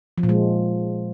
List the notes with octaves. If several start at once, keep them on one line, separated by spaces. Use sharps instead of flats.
F3
A#2
G#3